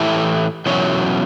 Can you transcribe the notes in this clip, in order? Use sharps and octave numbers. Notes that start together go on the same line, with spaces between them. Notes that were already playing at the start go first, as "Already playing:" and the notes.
Already playing: A2 E3 A3 E4 G4
E2 B2 F#3 C#4